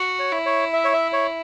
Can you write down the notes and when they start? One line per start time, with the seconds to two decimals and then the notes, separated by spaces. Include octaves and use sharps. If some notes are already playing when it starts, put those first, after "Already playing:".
Already playing: F#4
0.19 C#5
0.32 E4
0.46 C#5
0.73 E5
0.84 C#5
0.93 E5
1.13 C#5